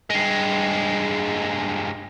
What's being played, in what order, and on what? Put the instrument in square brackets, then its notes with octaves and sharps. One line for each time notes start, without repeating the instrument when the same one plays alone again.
[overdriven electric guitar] G2 G#3